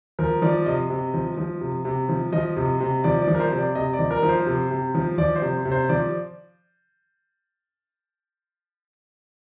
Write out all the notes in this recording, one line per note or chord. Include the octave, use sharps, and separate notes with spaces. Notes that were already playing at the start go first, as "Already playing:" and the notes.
F3 A#4
F3 D5
C3 D#5
C3
F3
F3
C3
C3
F3
F3 D#5
C3
C3
F3 D5
D5
F3
A#4
C5
C3
D5
C3 D#5
D5
F3
A#4
F3
C5
C3
C3
F3
F3 D5
C5
C3
C3
C5
F3 D5